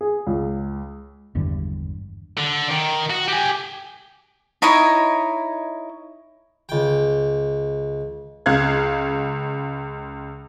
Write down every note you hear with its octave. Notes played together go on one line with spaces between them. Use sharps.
G#4
C#2
G#1 E2 G2 D3
D3
D#3
F#4
G4 G#5
D#4 E4 C#5 D#5
C#2 G5
C#2 F5 F#6 G#6